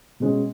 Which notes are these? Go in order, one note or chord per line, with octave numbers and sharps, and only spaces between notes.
B2 G#3 C#4